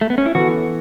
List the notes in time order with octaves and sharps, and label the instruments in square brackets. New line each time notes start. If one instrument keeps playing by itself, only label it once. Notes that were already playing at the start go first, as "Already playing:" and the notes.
[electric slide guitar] A3
B3
C#4
E4
[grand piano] E3 B3 A4 [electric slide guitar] F#4